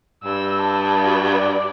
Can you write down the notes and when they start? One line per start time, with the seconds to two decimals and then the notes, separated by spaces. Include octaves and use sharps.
0.24 G2 E6
0.62 A5
1.03 F#4
1.39 D5